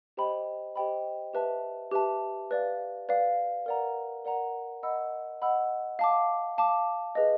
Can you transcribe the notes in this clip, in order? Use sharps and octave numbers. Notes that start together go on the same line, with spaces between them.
G4 C5 D#5 G5 B5
G4 C5 D#5 G5 B5
G4 B4 E5 A5
G4 B4 E5 A5
B4 D5 F5
B4 D5 F5
A#4 D5 F#5 A#5
A#4 D5 F#5 A#5
D#5 F#5 B5 E6
D#5 F#5 B5 E6
F5 A5 D6
F5 A5 D6
G#4 B4 D#5